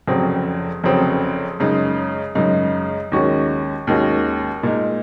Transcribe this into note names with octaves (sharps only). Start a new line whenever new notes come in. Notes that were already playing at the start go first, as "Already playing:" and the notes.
F1 F2 C#3 F#3 C4
F1 F2 C#3 F#3 C4
F#2 C#3 G#3 D#4
F#2 C#3 G#3 D#4
D#2 D#3 G#3 C#4 F#4
D#2 D#3 G#3 C#4 F#4
A#2 G#3 D#4